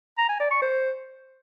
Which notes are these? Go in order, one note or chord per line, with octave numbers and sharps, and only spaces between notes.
A#5
G#5
D5
C#6
C5